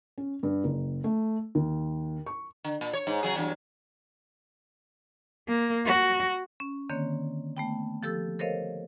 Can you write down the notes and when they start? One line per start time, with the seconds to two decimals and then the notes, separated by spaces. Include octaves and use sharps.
0.18 C#4
0.43 G2
0.64 F#1
1.04 A3
1.55 D#2
2.26 C#6
2.64 D3
2.81 A#2
2.93 C#5
3.07 G#2
3.23 C#3 F#3 G#4
3.35 E2 G2 F#3
5.48 A#3
5.86 F#4
6.60 C#4
6.89 D3 D#3 A#3 C4 C#5
7.57 A3 B3 G5
8.03 F3 G4 A4 E6
8.39 A4 A#4 C5 C#5 D#5 F5